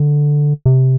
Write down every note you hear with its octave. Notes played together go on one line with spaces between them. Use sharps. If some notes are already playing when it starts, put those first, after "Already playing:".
Already playing: D3
C3